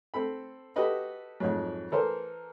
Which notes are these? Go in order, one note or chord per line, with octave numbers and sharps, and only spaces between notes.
C4 A4 B5
F#4 G4 A4 B4 D#5 B5
F2 G#2 F#3
E3 A4 A#4 C5